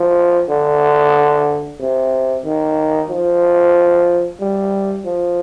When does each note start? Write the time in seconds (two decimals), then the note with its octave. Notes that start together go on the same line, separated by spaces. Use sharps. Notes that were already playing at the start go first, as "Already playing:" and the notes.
Already playing: F3
0.49 D3
1.80 C3
2.46 D#3
3.10 F3
4.41 G3
5.06 F3